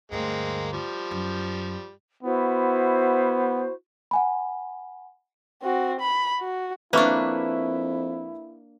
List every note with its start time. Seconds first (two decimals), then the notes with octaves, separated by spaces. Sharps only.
0.12 D2 G2 G#3 A#3 C4
0.73 F3 G3
1.11 F#2
2.23 B3 E4 F#4 C5
4.11 F#5 G#5 B5
5.63 C4 F#4
6.00 B5
6.40 F#4
6.93 F2 A#3 D4 E4 B4 E5 C#6